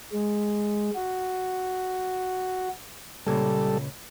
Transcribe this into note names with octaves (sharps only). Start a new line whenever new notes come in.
G#3
F#4
C#2 A#2 C#3 G3 A4